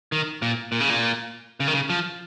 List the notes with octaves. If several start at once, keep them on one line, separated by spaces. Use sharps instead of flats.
D#3
A#2
A#2
C#3
A#2
C#3
D#3
C#3
F3